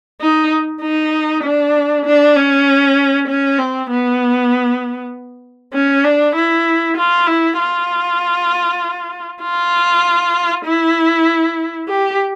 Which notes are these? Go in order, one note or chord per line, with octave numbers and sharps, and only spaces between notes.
D#4
D#4
D4
D4
C#4
C#4
C4
B3
C#4
D4
E4
F4
E4
F4
F4
E4
G4